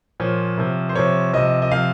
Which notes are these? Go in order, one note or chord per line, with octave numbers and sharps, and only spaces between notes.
A#2 F3 C#5
C3 F3
C5
C3 F3 C#5
C3 F3 D#5
D#5
C3 F3 F5